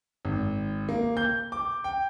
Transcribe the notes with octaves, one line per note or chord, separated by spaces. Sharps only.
G#1
A#3
G6
D6
G5